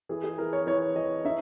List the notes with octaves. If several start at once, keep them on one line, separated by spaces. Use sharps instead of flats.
E3 G#4
G#4
E3 A#4
C#5
E3 C#5
E3 D#5
D#4 E5